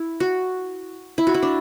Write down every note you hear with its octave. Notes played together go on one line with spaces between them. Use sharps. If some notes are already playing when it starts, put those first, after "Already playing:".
Already playing: E4
F#4
E4
F#4
E4
D4